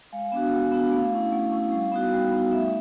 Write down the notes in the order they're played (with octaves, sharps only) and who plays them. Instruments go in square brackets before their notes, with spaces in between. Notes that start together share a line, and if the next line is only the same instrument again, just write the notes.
[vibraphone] G#3 F5
B3 D4 F#4
G#3 F#5
B3 D4 F#4
A3 F5
C#4 E4
A3 F#5
C#4 E4
G3 F5
B3 D#4 F#4
G3
B3 D#4 F#4
A3 E5